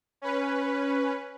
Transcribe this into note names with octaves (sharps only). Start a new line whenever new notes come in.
C#4 B4